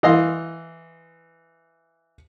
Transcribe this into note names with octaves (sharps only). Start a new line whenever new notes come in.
E3 D#5 F5 C6